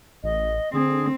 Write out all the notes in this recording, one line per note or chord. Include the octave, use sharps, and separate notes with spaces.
A1 D#5
D3 C4 G#4